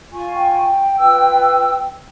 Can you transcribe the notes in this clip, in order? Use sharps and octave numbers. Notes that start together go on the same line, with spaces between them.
F4 G#5 C#6
G5
F4 B4 E6